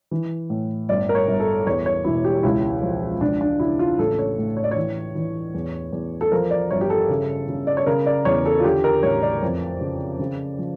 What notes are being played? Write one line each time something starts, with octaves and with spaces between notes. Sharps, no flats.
E3
A2
G1 D5
A#4
C#5
G1
A4
E2 C#5
C#5
E1 E4
G4
C#2 E4
F3
C#2 D4
D4
C#3 E4
F4
A1 A4
C#5
A2
C#5
D5
C#5
E3
E3
E2
E2
A4
F3 A#4
D5
G1 C#5
G4
A4
C#3
C#3
D5
C#5
C#3 A#4
D5
E2 C#5
A4
F4
D3 G4
A#4
A1 C#5
D5
F2
C#3
C#3
F3